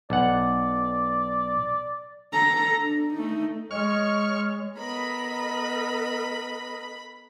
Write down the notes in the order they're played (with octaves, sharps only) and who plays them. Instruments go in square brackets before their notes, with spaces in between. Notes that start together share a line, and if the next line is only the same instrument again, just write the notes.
[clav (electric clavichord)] B1 F#5 [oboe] D5
[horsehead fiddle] A4 A#5
D4
A3 D#4
[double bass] G#3 [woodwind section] C#5 [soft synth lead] D#5 [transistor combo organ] C#6 F6
[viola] B3 A4 [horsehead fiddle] A#4 D#5 [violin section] B5